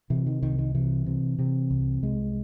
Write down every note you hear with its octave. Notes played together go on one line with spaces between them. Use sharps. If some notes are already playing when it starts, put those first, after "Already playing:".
C3 E3
D#3
C2 D#3
D#3
C3 E3
C3
C3
C2
C2 G#3